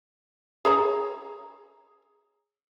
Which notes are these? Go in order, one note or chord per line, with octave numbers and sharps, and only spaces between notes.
G#4 C#5 A#5